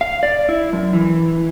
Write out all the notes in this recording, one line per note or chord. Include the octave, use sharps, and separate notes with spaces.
F5
D5
E4
F#2
E3